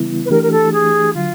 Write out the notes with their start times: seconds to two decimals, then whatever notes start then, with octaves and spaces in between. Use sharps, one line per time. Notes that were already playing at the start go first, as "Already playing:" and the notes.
Already playing: C#3 E3 G3 B3 E4
0.25 B4
0.30 E3 A3 D4 G4 A#4
0.42 A#4
0.51 A4
0.72 G#4
1.13 D3 F#3 F4